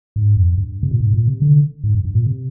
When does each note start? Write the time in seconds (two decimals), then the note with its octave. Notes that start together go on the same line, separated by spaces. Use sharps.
0.16 G#2
0.36 F2
0.58 G2
0.83 C3
0.91 A#2
1.00 G#2
1.14 A#2
1.28 C3
1.42 D3
1.84 G#2
1.95 G2
2.05 G2
2.15 A#2
2.26 C3